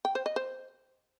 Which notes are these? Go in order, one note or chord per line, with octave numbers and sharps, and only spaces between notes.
G5
C5
D#5
C5